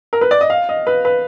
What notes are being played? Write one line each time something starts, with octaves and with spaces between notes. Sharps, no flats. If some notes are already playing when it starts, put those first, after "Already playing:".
A#4
B4
D5
D#5
F5
D#5
B4
B4